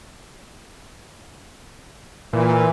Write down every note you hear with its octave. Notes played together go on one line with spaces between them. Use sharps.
A#2 E3